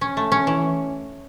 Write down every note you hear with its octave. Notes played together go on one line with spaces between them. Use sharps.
C#4
A3
C#4
E3